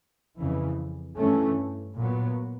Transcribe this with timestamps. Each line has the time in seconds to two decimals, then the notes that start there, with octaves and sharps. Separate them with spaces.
0.37 F2 C#3 E3
1.17 G2 E3 A3 C#4
1.97 A#2 F#3 B3